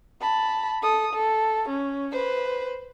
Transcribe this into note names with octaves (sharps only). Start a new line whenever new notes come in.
A5 B5
A4 D#6
A4
C#4
B4 C5